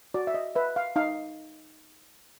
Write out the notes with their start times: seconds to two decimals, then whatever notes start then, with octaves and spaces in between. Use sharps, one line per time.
0.14 F#4 D5
0.27 E5
0.34 D#5
0.55 B4 E5
0.76 F5
0.96 D#4 F5